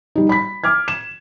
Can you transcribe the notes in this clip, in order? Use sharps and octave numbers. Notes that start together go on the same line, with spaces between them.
G3 D#4
B5 B6
D6 F6 G#6
E7